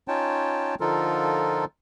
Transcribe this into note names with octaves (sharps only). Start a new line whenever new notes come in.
C#4 D#4 F4 C#5 G5 A5
D3 F3 D#4 F4 A4 A#4